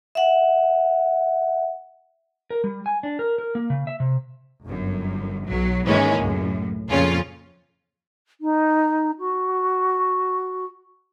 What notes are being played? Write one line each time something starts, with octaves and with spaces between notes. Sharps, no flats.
E5 F#5
A#4
G3
G#5
D4
A#4
A#4
A#3
C#3
E5
C3
G1 F#2
B1 F#3
G#2 D#3 E3 G#3 A#3 C#4
C#2 F#2 A2
F2 A#2 C#3 C#4 F4
D#4
F#4